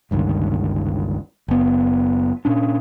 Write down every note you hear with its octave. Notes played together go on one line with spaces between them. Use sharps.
G1 C#2 G2 D#3
F#1 B3
A#2 C#4 D4